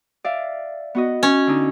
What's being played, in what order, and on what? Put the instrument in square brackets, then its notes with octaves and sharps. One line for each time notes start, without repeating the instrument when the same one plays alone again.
[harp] D5 E5 F5
B3 F#4 D#5
[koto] C#4
[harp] D3 D4 D#4